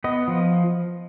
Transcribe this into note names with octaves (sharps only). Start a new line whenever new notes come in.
B3 D#5
F3